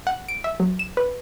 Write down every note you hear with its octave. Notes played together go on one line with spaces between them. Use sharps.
F#5
D7
E5
F#3
E7
B4